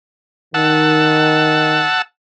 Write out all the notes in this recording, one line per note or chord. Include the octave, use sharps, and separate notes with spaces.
D#3 F#5 A5 E6